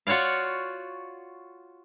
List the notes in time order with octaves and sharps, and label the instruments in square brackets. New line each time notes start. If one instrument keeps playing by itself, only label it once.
[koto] F4 F#4 C#5 D5 F5